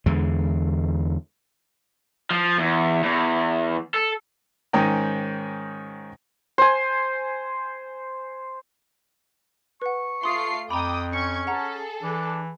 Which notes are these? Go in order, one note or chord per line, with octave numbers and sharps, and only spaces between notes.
E2 D3 G#3
F3
E2
E2
A4
G#2 D#3 C#4 G5 A#5
C5 G#5
B4 F#5 C#6
A3 F4 C6 D#6 C7
F2 G5 A#5 B5 D6 D#6
C#4 C#6 G#6 C#7
G#4 A4 F#5 A#5
E3 D4